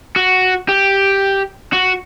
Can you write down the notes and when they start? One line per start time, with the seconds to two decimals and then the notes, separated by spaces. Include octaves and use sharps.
0.16 F#4
0.69 G4
1.73 F#4